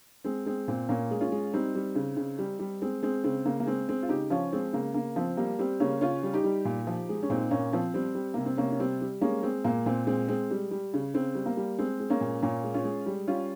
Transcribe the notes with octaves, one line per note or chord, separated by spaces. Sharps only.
G#3 C4
G#3 C4
A#2 C4
A#2 A#3 C#4
G#3
C#4 F4
G#3
G3 C4 D#4
G3
C#3
C#3
G3
G3
G#3 C4
G#3 C4
C#3 C4
C#3 A#3
A#3
G#3 C4
G#3 C4
F4
C#3 D#4 G4
F3 C#4 F4
G#3 C4
C#3 A#3
C#3 A#3
F3 C4
G3 A#3
G3 C4
C#3 A#3 C#4
C#3 C#4 F4
G3
D#4 G4
G3
A#2
F3
G#3
C#4
A#2 C4 D#4
A#2 A#3 C#4
F3 C4
G3 C4
G3
C3 A#3
C4
C3 A#3 C#4
C#4
G3 C4
G3
G#3 A#3 C#4
G#3 C4
A#2 A#3
A#2 C4
G#3 C4
G#3 C4
G3
G3
C#3
C#3 C4
G3
A#3
G3
G#3 C4
G#3
A#3 C#4
A#2
A#2 A#3 C#4
G#3
C#4 F4
G#3
G3
G3 C#4 F4